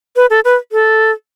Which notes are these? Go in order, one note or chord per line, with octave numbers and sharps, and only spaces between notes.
B4
A4
B4
A4